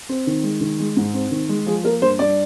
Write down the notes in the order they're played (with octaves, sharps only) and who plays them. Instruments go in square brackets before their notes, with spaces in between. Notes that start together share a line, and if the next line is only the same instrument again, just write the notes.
[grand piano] C4
D#3
G#3
D#3
G#3
G#2
C4
D#3
G#3
F3 G#4
A#3 A#4
G2 C5
G2 D5